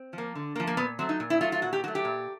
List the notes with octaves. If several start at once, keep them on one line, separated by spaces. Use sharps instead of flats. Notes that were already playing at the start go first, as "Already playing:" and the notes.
Already playing: C4
F3
A#3
D3
A#3
F3
A#3
A#2 B3
F#3 A3 C4
D#4
A#2
E4
F#3 A3 F4
F4
A#2 F#4
G4
F#3 A3 F#4
G4
A#2